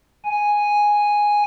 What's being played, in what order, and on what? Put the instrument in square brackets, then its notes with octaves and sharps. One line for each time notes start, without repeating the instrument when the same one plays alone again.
[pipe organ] G#5